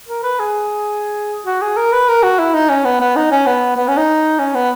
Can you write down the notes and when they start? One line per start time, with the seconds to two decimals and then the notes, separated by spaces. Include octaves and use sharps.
0.08 A#4
0.23 B4
0.39 G#4
1.46 F#4
1.62 G#4
1.77 A#4
1.92 B4
2.08 A#4
2.23 F#4
2.39 E4
2.54 D#4
2.69 C#4
2.85 B3
3.00 B3
3.16 D#4
3.31 C#4
3.46 B3
3.76 B3
3.88 C#4
3.97 D#4
4.39 C#4
4.54 B3